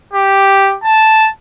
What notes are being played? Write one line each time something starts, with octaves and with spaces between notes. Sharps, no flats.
G4
A5